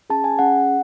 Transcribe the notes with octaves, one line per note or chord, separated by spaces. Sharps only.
C#4 G#4 A5
G#5
C#4 G#4 F#5